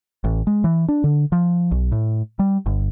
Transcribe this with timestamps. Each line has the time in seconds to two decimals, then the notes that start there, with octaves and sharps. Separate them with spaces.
0.24 A1
0.47 G#3
0.64 E3
0.88 D4
1.04 D3
1.32 F3
1.71 B1
1.92 A2
2.39 G3
2.66 G1